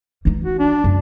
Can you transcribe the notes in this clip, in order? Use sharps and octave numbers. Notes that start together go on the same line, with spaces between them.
E3 D#4
F#4
D4
F#2